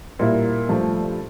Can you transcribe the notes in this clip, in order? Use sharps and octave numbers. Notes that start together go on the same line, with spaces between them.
A#2 G3 A#3 E4
G2 F3 A3